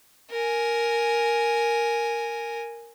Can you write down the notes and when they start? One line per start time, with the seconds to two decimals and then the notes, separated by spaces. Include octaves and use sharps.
0.31 A#4 G#5